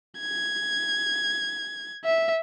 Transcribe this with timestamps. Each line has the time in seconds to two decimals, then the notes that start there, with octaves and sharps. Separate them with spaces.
0.21 G#6
2.04 E5